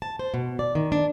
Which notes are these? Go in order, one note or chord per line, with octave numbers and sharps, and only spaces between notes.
A5
C5
B2
D5
D#3
D4